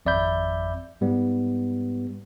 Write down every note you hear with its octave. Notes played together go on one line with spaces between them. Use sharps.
G#1 F2 D5 E5 B5 G6
G#2 G3 B3